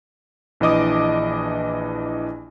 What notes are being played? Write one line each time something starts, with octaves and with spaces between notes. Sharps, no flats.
A#1 E3 D4 D#5 D6 D#6